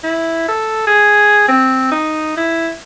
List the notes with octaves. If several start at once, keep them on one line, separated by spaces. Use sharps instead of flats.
E4
A4
G#4
C4
D#4
E4